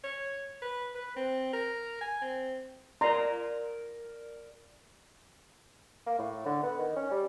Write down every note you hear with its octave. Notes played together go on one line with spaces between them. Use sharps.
C#5
B4
B4
C4
A#4
G#5
C4
A#4 D5 A#5 C6
A#3
A2
D3
B3
D#3
C#4
G3